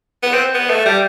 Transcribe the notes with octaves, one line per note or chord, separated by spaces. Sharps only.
B3
C4
B3
A3
G3